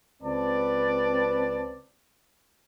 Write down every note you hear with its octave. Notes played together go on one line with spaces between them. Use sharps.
C#2 C4 B4 D5 A5